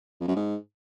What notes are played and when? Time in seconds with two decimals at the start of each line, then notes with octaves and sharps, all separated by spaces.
0.20 F2
0.28 F#2
0.36 G#2